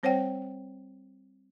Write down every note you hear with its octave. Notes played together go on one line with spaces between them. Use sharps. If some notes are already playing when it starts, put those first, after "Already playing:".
G3 C4 C5 C#5 F#5 G5